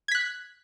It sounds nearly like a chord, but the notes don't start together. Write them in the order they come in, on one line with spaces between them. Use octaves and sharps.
G#6 B6 F#6